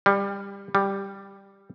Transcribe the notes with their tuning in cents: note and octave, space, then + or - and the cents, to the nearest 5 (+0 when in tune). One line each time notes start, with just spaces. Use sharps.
G3 +20
G3 +5